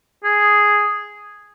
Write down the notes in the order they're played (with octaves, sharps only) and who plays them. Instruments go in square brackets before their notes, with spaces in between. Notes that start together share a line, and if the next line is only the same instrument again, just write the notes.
[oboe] G#4